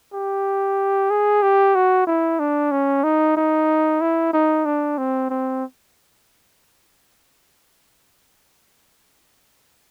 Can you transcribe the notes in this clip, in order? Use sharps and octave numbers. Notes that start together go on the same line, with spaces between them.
G4
G#4
G4
F#4
E4
D4
C#4
D#4
D#4
E4
D#4
D4
C4
C4